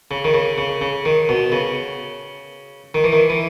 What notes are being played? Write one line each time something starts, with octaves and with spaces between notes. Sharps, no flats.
C#3
D#3
C#3
C#3
C#3
D#3
B2
C#3
D#3
E3
D#3
E3